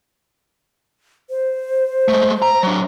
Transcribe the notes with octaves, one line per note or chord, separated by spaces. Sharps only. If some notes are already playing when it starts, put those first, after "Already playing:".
C5
G#3 A3
A#5
F#3 D4